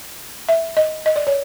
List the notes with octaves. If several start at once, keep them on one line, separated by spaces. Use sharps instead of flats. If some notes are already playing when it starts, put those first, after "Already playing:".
E5
D#5
D#5
D5
C#5